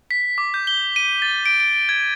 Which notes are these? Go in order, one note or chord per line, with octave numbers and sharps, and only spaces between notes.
B6
D6
G6
G7
D#7
A6
D7
D7
G#6